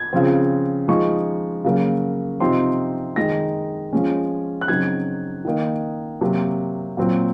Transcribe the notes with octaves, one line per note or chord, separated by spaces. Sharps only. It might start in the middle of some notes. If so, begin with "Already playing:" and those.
Already playing: G#6
C#3 F3 C4
F3 G#3 D#4 C#6
C#3 F#3 A#3
C3 F3 C4 D#4 C6
D#3 G#3 D#4 A#6
F3 G#3 C#4
F#6
C#3 F#3 C4 D#4 G#6
D#3 A#3 D#4
C3 F#3 A#3
A#2 F#3 C4